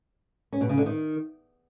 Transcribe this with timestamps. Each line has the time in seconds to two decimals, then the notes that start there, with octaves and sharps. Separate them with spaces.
0.53 C#4
0.61 B2
0.69 C#3
0.78 D3
0.86 D#3